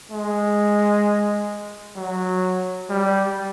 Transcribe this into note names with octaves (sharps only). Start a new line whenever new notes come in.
G#3
F#3
G3